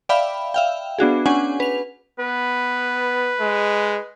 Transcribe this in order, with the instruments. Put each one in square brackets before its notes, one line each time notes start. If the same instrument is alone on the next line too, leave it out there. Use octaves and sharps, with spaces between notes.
[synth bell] D5 E5 F5 G5 B5
E5 F5 G5
B3 D4 F#4 G#4
C#4 D4 F#5 G#5
B4 F7
[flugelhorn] B3 [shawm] B4
[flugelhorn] G#3